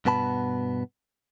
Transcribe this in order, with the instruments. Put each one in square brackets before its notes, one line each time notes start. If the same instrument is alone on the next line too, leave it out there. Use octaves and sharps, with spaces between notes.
[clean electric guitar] G2 B2 B3 A5 B5